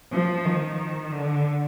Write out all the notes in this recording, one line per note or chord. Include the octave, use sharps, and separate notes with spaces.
F3
D#3
D3